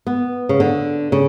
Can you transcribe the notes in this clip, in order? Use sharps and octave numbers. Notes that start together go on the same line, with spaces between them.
B3
C#3
D3
C#3